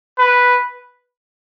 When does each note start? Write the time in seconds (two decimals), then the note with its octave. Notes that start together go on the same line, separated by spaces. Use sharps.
0.18 B4